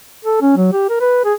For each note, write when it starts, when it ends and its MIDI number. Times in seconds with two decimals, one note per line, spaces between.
0.25 0.40 69
0.42 0.54 61
0.57 0.69 54
0.73 0.86 67
0.89 0.97 70
1.01 1.21 71
1.25 1.34 68